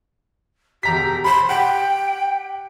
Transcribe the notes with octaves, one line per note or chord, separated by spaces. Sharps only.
E1 G4 A#5 B6
B5 C6
G4 F#5 G5